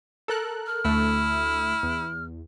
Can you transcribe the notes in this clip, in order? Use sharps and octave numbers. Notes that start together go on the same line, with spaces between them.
A4 A#4 F#6
F6
D2 A3 E4
E2